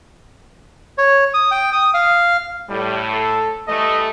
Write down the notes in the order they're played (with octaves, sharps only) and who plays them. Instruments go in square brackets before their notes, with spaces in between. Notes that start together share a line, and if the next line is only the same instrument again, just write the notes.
[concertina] C#5
D#6
G5
D#6
F5
[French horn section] A2 [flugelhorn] G3
[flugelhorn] A4
[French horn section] E3 G3 A3 [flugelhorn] D#5